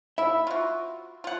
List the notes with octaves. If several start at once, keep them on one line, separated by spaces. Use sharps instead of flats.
E4 E5
F4 F#4
F4 F#5